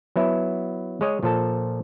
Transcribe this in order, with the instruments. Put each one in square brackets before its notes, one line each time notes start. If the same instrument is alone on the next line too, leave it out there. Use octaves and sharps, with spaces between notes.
[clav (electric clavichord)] F#3 B3 E4 E5
G#3 G#4 C#5 D#5
A#2 F3 A4 A5